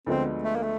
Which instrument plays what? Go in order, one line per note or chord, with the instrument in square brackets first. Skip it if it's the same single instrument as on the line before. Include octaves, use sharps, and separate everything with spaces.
[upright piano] D2 D3 F3 G#3 B3 [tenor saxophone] C4
[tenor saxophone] A3
A#3
A3